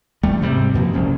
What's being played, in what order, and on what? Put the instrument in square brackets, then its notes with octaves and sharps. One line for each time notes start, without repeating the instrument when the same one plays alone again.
[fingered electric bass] G1 E2 G3 A3
G#2 C3 G3
F#2 B2 F3 A#3
F#1 C2 F#2 C#4